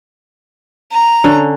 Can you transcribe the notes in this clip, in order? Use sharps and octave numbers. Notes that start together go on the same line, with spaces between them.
A#5
D3 C#4